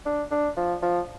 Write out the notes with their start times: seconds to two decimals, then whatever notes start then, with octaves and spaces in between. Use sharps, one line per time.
0.05 D4
0.31 D4
0.56 F3
0.82 F3